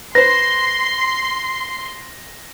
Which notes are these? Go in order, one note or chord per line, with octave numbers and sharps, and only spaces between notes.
B4 C5 C6 A#6